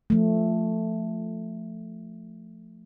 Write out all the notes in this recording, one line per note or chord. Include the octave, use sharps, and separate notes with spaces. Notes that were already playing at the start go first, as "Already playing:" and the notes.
F3 A3